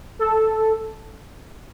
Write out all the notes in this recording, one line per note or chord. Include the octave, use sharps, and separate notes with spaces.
A4